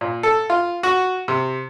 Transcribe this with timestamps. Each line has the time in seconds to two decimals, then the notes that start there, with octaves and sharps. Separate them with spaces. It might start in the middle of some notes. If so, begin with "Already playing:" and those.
0.01 A#2
0.23 A4
0.50 F4
0.83 F#4
1.28 C3